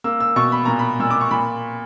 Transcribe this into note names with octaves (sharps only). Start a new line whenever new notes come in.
A#3 E6
E6
B2 C#6
B5
A#2 A#5
B5
A#2 E6
D6
C#6
A#2 B5